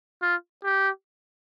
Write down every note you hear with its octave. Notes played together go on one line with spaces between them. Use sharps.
F4
G4